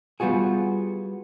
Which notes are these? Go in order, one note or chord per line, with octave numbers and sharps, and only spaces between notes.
G3 B3 F4 F#4 G#4